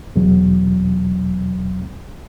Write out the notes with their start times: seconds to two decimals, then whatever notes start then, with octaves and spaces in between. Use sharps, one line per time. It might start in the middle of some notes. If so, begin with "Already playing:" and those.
0.16 E2 B2 F#3